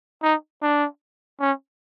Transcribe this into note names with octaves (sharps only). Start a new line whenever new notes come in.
D#4
D4
C#4